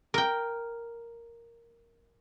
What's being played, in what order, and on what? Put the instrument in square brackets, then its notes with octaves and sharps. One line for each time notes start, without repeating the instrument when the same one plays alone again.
[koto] A#4 G5